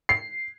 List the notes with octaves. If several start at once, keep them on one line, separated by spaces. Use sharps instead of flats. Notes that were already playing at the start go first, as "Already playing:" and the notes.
C7